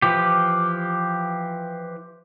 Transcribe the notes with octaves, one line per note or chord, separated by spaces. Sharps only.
E3 F3 G4